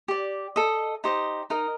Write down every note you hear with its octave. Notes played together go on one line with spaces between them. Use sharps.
G4 D5
A4 D#5
D#4 G4 C5 D#5
D#4 A#4 D#5